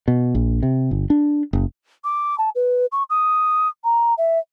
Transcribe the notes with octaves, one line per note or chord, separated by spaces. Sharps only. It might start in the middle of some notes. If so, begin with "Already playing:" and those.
B2
A#1
C3
G1
D4
F#1
D6
A5
B4
C#6
D#6
A#5
E5